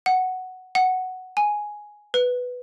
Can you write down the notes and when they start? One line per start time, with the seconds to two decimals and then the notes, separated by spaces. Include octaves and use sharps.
0.06 F#5
0.75 F#5
1.37 G#5
2.14 B4